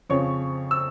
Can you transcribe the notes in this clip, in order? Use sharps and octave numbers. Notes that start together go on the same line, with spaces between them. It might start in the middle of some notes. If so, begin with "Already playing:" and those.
F2 C#3 F3 C#5 C#6
E6